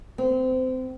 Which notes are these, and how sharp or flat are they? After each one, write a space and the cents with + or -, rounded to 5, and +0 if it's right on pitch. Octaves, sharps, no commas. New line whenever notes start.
C4 -25